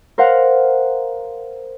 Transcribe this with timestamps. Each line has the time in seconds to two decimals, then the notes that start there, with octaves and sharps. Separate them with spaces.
0.18 A#4 C5 F5 F#5